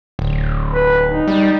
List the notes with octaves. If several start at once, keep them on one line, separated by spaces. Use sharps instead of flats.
D1
B4
D#4
G3